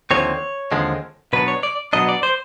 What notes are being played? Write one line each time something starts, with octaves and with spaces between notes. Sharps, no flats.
D#2 D3 F3 C4 C#5
D#2 D3 F3 G#3 C4
B2 F#3 B3 D4 B4
C#5
D5
B2 F#3 B3 D4 D#5
D5
C5